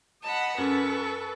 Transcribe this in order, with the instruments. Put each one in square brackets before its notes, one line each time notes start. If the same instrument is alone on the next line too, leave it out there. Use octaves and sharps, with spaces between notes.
[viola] D#5 B5 [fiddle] F#5 A5
[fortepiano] F#2 [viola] A4 B4 [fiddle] C#6